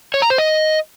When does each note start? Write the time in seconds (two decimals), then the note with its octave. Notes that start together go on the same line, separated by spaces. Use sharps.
0.14 C#5
0.22 A#5
0.30 C5
0.38 D#5